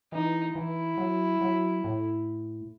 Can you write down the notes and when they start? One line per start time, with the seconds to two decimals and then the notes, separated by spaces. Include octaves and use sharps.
0.12 E3 D#4
0.55 E3 E4
0.98 F#3
1.41 F#3
1.84 A2